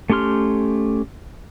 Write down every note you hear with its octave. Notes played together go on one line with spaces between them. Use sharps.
A3 C#4 G4 C6 F6